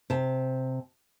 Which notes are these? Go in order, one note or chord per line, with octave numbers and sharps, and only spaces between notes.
C3 A5